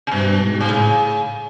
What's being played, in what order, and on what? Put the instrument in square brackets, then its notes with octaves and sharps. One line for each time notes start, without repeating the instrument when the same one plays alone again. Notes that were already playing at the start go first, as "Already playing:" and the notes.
[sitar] C3
[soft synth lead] G2 [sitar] B2
[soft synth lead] G#2
[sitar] C3
[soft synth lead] A2 [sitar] C#3